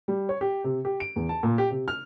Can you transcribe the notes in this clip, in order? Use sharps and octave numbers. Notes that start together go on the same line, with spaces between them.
G3
C#5
G4
C3
G4
D7
E2
A5
A#2
G4
C3
F6